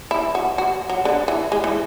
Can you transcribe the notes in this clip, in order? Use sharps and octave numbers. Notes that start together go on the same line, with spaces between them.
E4
F#4
F#4
F#3
D3
E3
G#3
E3